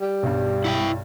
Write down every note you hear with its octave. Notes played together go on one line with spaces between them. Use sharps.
G3
B1 G2
E4 F#5 G5